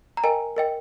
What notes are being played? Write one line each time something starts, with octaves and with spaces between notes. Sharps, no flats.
A#5
A#4 D#5 G5 G#5
A#4 D#5 G5